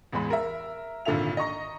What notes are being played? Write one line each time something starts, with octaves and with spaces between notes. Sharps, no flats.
A1 E2 G#3 B5
A#4 E5
G#1 A#2 D3 A4 E5 F7
D#5 A#5 C#6 A#6